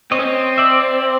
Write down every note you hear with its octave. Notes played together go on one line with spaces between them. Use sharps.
C4 C#5 D#5
C#4
C4
D5 E5